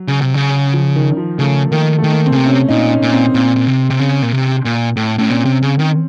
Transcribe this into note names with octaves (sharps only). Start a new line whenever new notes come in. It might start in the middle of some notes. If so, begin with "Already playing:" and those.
Already playing: F#3
C#3
C3
C#3
F3
D#3
F3
C#3 A3
D#3 A#3
D#3 A3
A#3
C4
C#3
C3
C#4
A#2 D#4
C#4
A#2
C4
A#2 C4
A#2
C3
C3
C#3
A#2
C3
A#2
A2
A2 C#4
A#2 C4
C3
C#3
D#3